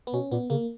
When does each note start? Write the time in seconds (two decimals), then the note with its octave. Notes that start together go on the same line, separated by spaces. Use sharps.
0.07 B3
0.13 B2 C#4
0.32 A#2 B3
0.50 C#3 A#3